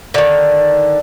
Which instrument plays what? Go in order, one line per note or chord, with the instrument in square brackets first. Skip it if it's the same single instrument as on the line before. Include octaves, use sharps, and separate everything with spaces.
[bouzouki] D3 D#3